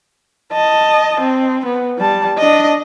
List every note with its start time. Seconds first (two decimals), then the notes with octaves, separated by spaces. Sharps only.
0.53 D#5 A5
1.21 C4
1.66 B3
1.98 G3 A5
2.38 D4 D#5